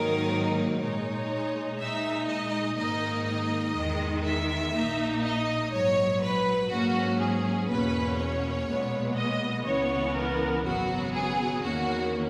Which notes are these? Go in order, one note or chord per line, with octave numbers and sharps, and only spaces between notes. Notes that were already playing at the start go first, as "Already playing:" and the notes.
Already playing: G#2 D#3 F#3 A#3 D#4 A#4
A#2 G#3 D#4 C#5
A#2 G#3 D#4 E5
D#5
G#1 G#2 D#3 A#3 D#4 D#5
D#5
E2 D#3 G#3
E5
A#1 A#2 A#3 D#4
D#5
A#1 G#2 F#3 C#5
B4
G#2 F#3 A#3 C#4 F#4
G#4
E2 B2 A#3 C#4 B4
C#5
B1 A#2 G#3 B3
D#5
C#2 C#3 E3 B3 C#5
A#4
G#1 F#2 C#3 F#3 B3 F#4
G#4
E2 D#3 A#3 C#4 F#4